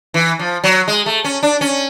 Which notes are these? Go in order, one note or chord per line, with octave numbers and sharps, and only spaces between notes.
E3
F3
F#3
G#3
A3
C#4
D4
C#4